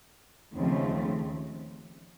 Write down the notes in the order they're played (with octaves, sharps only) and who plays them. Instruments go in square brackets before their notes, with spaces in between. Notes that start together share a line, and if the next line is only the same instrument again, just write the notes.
[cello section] D#2 C#3 F3 A3 C4